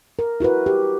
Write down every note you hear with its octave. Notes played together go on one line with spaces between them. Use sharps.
A#4
E4 F#4 A#4 B4
G4